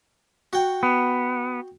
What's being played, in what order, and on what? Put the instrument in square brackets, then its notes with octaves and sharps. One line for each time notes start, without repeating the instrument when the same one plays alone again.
[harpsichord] F#4 G5
[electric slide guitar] B3